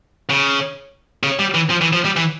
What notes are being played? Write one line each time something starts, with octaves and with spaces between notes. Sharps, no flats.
C#3
C#3
G3
E3
F3
E3
F3
G3
E3